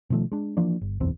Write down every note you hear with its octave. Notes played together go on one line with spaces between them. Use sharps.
B2 D#3 F3 A3
G#3 D4
E3 F3 A#3 D4
G1
F#1 B1 E2 C4